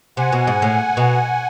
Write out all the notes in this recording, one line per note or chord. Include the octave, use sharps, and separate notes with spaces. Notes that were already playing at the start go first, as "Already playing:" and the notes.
C3 F#5 G#5
B2
G#2
A2
B2